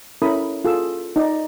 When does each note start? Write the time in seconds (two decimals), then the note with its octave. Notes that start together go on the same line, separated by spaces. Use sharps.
0.22 C#4 E4 A4 A#4 B5 D#6
0.65 F4 G#4 A4 E6
1.16 D#4 D5